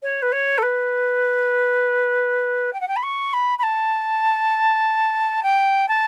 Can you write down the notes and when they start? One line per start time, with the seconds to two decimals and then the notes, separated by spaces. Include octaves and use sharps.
0.02 C#5
0.22 B4
0.32 C#5
0.58 A4
0.62 B4
2.73 G5
2.80 F#5
2.87 G5
2.96 B5
3.02 C#6
3.33 B5
3.58 B5
3.63 A5
5.43 G5
5.88 A5